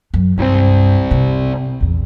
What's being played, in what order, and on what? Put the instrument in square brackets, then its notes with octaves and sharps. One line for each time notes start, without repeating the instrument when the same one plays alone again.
[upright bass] F#2
[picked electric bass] C2 F3 C4 [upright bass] G2
[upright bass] C3
A#1 E2